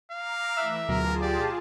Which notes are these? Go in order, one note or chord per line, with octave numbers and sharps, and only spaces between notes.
F5 A#5 D6
E3 A3 E5 E6 F#6
D2 B2 F#3 F4 G#4 A#4 A5
G4 D5